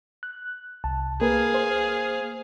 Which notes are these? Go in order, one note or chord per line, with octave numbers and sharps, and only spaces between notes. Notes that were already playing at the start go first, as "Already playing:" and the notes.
F#6
C2 A5
A#3 G#4 A#4 B4 F5
C5